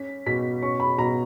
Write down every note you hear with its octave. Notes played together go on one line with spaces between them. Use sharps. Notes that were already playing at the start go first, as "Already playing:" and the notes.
Already playing: C#4 B6
B2 B6
C#4 C#6
B5
B2 A#5